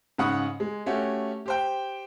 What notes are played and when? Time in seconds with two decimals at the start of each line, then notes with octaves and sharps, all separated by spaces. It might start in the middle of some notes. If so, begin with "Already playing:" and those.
0.18 G#2 C#3 F#5 B5 C#6 D#6
0.60 G#3
0.86 A3 C#4 F#4 G4
1.46 G4 C5 G5